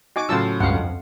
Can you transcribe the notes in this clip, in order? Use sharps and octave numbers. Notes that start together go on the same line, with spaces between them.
D#4 F#4 G#5 D6
A2 C#3 F#3 F4 A5 E6
C#2 G2 F5 F#5
F2